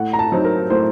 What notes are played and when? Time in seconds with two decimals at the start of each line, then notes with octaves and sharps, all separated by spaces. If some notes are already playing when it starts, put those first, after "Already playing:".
Already playing: A2 F#5
0.13 A#5
0.19 A5
0.32 F#3 C4 D#4
0.45 A#4
0.70 A2 C5